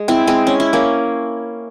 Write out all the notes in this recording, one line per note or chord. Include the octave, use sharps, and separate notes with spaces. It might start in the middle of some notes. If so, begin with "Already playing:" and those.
Already playing: G#3
C4 E4
G#3 C4
C#4
E4
A#3 C#4